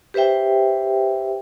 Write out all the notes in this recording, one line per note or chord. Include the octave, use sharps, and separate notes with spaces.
G4 B4 C5 E5 G5